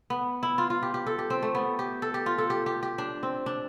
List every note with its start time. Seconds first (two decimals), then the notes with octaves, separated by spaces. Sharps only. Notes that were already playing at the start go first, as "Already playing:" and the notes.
0.10 B3
0.43 E4
0.58 F4
0.70 F4
0.83 G4
0.94 G4
1.07 A4
1.19 G4
1.30 C4
1.42 A3
1.55 B3
1.79 G4
2.02 A4
2.14 G4
2.26 F4
2.38 A4
2.50 G4
2.66 G4
2.83 G4
2.98 D4
3.23 C4
3.46 D4